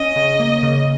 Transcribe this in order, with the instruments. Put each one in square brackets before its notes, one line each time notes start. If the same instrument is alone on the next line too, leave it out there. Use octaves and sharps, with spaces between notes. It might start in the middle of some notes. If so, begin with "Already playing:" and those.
Already playing: [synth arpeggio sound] C#4 [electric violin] D#5
[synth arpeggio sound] C#3
A#3
C#3